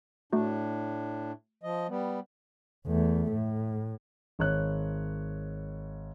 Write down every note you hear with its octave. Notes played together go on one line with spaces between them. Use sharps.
A2 A3 D4 F#4
F3 D#5
G3 B3
E2 A3
A2
G#1 C#5 F#6